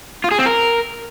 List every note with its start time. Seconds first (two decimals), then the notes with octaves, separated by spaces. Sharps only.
0.24 F4
0.31 G#4
0.39 C4
0.46 A#4